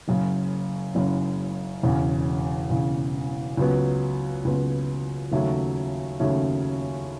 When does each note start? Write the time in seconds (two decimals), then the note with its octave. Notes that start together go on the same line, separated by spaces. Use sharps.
0.08 F#1 F#2 C#3
0.95 F#1 F#2 C#3
1.83 E1 E2 C#3
2.70 E1 E2 C#3
3.57 C#2 C#3 F#3 B3
4.45 C#2 C#3 F#3 B3
5.32 D#2 C#3 F#3 A3 C#4
6.20 D#2 C#3 F#3 A3 C#4